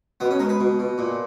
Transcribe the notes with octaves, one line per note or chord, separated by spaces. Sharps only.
B2 B3
C#4
G#3 A#4
B4
B2
B2
A#2